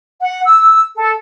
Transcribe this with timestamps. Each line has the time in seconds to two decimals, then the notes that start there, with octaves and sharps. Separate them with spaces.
0.20 F#5
0.44 E6
0.95 A4